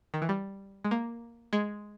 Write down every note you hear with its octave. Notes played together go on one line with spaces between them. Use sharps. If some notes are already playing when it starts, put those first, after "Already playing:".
D#3
E3
G3
G#3
A#3
G#3